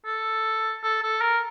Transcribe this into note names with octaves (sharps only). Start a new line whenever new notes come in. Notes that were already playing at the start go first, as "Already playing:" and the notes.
A4
A4
A4
A#4